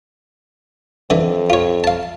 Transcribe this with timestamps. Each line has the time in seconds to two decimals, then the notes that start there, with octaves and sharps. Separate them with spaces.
1.10 F2 D3 E3
1.50 F4 C#5
1.84 F5 A5